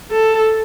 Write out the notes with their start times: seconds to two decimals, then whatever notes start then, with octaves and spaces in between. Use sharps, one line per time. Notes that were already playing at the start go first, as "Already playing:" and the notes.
0.11 A4